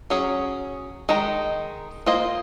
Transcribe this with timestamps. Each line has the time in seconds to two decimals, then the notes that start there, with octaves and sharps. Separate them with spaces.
0.10 F#3 C#4 G#4
1.09 D#3 G#3 D#4
2.06 A#3 F4 C5 D#5